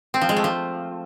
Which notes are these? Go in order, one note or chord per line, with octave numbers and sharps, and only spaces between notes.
C4
F3
G#3
A3
F3